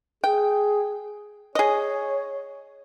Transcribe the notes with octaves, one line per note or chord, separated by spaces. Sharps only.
G#4 G5
G#4 C#5 D#5